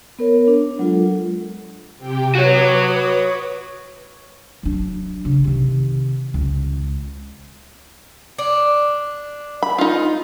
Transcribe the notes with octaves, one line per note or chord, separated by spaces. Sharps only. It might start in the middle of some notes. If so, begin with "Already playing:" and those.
B3 A#4 C#5
D4
F#3 G#3 F4 A4
C3 G4 G5
F#4 B4 C#5 D6 D#6
F#3 D4
C#3
C3 D#3
C#2
D4
B5
D#4 F4